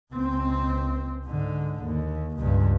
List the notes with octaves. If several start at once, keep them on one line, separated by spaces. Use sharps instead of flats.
C#2 C4
G#2 D3
D#2
C#2 G2